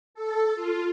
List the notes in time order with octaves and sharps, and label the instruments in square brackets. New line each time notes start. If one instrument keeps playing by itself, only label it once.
[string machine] A4
F4